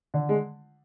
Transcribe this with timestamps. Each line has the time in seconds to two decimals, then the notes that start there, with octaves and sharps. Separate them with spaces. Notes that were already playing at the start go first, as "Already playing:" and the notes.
0.14 D3
0.29 G#3